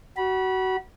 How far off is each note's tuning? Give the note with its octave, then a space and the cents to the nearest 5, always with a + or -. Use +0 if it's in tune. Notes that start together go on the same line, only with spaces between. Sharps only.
F#4 +25 B5 -25